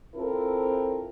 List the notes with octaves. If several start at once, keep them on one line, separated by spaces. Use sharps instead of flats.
C4 E4 F4 A4 A#4